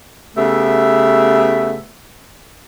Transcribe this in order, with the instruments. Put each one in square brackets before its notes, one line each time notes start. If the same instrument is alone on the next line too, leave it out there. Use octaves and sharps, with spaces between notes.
[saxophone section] C#3 A3 B3 G4 E5